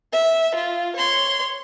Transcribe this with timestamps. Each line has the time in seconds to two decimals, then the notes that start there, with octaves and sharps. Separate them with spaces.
0.13 E5
0.55 F4
0.96 C#5 C6